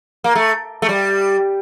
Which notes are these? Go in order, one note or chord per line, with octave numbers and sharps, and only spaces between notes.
A#3
A3
A3
G3